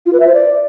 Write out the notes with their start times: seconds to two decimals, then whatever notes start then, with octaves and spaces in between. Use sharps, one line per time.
0.06 F4
0.13 B4
0.20 E5
0.27 C5
0.34 D5